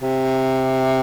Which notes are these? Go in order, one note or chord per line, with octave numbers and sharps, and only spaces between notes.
C3